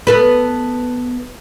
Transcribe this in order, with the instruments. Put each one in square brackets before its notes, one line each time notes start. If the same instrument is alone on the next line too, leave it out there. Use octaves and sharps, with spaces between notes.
[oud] B3 A4 B4